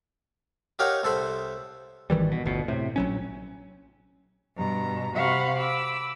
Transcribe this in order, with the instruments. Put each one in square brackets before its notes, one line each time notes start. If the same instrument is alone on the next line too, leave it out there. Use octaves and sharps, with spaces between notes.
[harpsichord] D#4 G4 A#4 C#5 F5 F#5
C2 A4 C5 B5
[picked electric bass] G#1 D#3 E3 G3
B2
G1 D2 B2
A2 C3
A#1 F#3 C#4
[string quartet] G2 B2 A#5
C3 F#4 F5 F#5 B5 C#6
B5 D6 E6